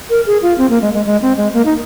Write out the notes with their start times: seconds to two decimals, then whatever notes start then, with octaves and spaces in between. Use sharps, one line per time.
0.10 A#4
0.26 G#4
0.42 F4
0.58 C4
0.70 A#3
0.82 G#3
0.94 G#3
1.06 G#3
1.22 C4
1.37 G#3
1.54 A#3
1.66 D#4